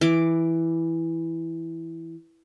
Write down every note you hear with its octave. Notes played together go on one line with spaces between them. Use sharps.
E3 D6